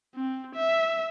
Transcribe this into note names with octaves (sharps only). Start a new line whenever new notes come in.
C4
E5